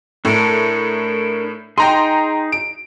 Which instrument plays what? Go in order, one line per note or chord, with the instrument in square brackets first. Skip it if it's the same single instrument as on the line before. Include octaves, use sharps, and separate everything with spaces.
[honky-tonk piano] A2 [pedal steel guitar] D4 A4 A#4
[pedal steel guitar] D#4 G#4 [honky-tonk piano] G5 A#5 C6
[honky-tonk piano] D7